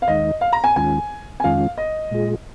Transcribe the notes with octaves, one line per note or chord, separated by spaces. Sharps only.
F5
D#2 D#3 G#3 D#4 D#5
F5
A#5
G#5
D#2 D#3 G#3 C#4 F4 G#5
G#5
F2 D#3 G#3 C#4 F4 F5
D#5
A#2 G#3 F4 G#4